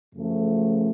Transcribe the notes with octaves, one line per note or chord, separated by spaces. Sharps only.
F#2 C#3 F3 A3